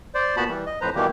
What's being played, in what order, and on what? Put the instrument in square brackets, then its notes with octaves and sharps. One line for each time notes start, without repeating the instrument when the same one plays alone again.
[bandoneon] C5 D5
A#2 B3 F#4 A5 B5
E3 G3
D#5
F2 A2 F3 B4 C5 A#5
B2 D#3 E3 G3 A#3 G4